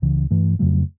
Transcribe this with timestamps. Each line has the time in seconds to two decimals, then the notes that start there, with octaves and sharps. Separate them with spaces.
0.02 C#2 C#3 E3
0.31 G2 E3 A3
0.59 F2 C#3 F#3 A3